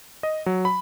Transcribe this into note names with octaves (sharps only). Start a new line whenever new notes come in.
D#5
F#3
B5